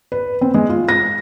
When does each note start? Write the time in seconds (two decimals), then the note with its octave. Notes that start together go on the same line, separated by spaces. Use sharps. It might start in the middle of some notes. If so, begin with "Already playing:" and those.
0.12 B4
0.41 C4
0.54 G#3
0.69 F4
0.89 A#6